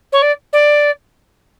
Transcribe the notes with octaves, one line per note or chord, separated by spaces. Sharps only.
C#5
D5
D5